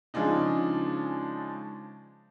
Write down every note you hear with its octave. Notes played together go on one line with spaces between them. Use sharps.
C#3 F3 G#3 D4 D#4